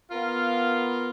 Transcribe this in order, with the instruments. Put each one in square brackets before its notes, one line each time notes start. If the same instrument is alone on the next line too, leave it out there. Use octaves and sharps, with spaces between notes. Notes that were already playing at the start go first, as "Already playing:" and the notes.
[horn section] B3 F4 A#4 F5